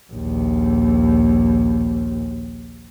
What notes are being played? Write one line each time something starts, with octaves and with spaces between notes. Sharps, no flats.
A#1 D#2